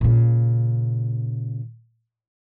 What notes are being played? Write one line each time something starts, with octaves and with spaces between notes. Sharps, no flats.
A#2 C#3